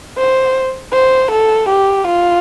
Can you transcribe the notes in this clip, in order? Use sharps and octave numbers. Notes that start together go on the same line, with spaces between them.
C5
C5
A4
G4
F4